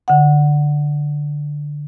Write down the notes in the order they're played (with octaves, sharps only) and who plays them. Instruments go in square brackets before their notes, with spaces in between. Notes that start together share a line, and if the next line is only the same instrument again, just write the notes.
[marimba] D3 F#5